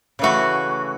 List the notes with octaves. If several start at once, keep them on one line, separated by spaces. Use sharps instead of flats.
C#3 E3 A3 F#4